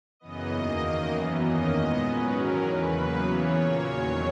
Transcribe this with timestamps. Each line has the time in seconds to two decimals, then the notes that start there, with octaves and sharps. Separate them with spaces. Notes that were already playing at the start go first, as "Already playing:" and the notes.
0.20 F#2 C#3 E3 B3 D#5
0.51 E2 D#3 A#3
0.81 F#2 D#3 A#3
1.12 F#2 E3 B3
1.41 E2 D#3 A#3 C#4 D#5
1.72 A#2 G#3 B3 D#5
2.02 G#2 F#3 C#4 B4
2.33 E2 D#3 F#3 C#4 A#4
2.64 E2 C#3 E3 B4
2.93 C#3 F#3 A#3
3.24 C#3 E3 B3 C#5
3.55 A#2 A#3 C#4 C#5
3.85 E2 D#3 F#3